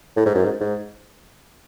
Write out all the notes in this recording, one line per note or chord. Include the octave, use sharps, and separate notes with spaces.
A2
G#2
F#2
G#2
G#2